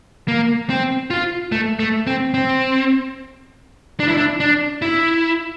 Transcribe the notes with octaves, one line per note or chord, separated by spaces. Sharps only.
A#3
C4
F4
A3
A3
C4
C4
D4
E4
D4
D4
E4